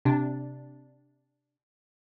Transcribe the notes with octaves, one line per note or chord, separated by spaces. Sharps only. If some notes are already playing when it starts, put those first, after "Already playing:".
C3 D4